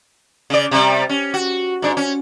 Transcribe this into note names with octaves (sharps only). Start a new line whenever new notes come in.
C#3 D5
C3 G3
C#4
F#4
G#2 D4
C#4